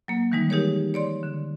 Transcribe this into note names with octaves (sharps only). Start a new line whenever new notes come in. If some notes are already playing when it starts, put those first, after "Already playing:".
F#3 A#3
D#3 E3 G3 G#3 D#4
D#4 G4 G#4 A#4 C#5
C#5 D5 C6
D3